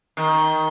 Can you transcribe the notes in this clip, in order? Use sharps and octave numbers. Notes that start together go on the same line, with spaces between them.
D#3